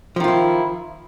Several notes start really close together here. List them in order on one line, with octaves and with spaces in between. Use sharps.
F3 D#3 F4 E4